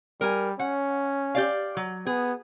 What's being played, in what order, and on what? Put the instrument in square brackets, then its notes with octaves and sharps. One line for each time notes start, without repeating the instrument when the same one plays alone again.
[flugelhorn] G3 [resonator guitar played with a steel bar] A#4 G#5
[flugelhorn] C#4 [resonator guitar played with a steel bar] F#5
[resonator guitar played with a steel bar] G4 D5 F5
F#3
[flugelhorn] B3 [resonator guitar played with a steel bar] G#4